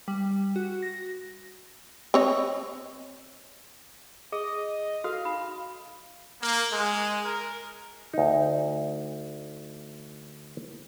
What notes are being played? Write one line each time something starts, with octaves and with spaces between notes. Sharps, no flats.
G3
F#4
A#6
C4 C#5 D#5
G#4 D#5
F#4 A4 F5
D#4 B5
A#3
G#3
A#4
D2 D#4